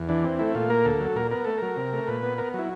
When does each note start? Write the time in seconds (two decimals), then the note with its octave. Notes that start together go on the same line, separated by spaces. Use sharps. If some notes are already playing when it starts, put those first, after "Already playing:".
Already playing: E2
0.09 E3 D4
0.24 C4
0.39 A3 E4
0.55 A#2 F4
0.70 A#3 A#4
0.85 D2 A4
1.00 F#3
1.16 A#2 A#4
1.31 B3 A#4
1.45 A3 A4
1.58 F#3 A#4
1.76 C3
1.93 A3
2.08 A#2 B4
2.23 B3
2.38 B3 A#4
2.54 F#3 E4